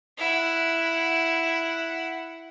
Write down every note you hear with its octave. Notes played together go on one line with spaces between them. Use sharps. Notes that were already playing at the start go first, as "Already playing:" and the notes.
E4 F#5